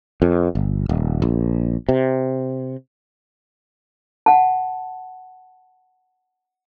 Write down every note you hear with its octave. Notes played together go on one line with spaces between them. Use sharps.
F2
G1
D#1
A#1
C3
F#5 A5